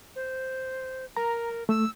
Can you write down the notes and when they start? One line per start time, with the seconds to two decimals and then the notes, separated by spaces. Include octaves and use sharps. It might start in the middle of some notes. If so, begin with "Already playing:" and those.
0.16 C5
1.17 A#4 A#5
1.69 A3 E6